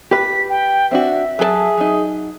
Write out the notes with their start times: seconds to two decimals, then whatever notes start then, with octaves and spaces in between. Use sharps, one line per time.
0.11 G4 B4 B6
0.50 G5
0.91 C4 D4 F#4 E5
1.39 F#3 G#4 A4 A5
1.77 F#3 D#4